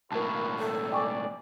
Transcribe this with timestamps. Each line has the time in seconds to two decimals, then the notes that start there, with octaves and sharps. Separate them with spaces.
0.12 B1 A2 F4 F#4 A#4 B4 A5
0.59 A4
0.92 D5 G5 G#5 C#6